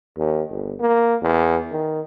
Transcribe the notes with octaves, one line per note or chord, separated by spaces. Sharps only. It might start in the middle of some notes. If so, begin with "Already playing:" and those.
D#2
G1
A#3
E2
D#3